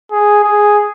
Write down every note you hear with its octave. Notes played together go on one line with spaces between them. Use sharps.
G#4
G#4